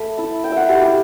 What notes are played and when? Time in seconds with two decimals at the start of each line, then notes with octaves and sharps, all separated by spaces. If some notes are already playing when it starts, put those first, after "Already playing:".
Already playing: A3 B5
0.18 E4 A5
0.44 A3 G5
0.52 E5 F#5
0.69 E4 G4
0.82 G4